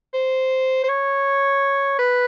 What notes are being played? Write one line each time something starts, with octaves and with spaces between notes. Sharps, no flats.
C5
C5
C#5
B4